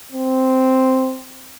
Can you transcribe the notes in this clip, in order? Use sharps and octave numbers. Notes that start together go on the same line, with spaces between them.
C4